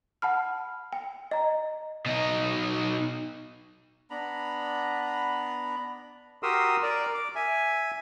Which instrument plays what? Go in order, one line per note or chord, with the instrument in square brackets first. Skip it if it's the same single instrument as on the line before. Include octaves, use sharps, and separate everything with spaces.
[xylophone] F#5 A5 B5 F6
G5
D#5 A#5
[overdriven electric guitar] B2 D#4
[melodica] B3 D4 A#5 B5
[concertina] F#4 G4 A#4 C6 D#6 E6
A#4 D5
D6
E5 G#5